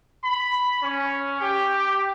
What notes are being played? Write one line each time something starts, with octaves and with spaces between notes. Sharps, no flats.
B5
C#4
G4